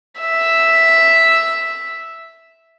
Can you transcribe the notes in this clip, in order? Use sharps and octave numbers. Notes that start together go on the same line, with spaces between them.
E5